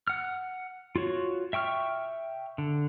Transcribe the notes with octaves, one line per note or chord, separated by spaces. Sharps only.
F#5 F6
F4 F#4 C#5
E5 G5 C#6 F6
D3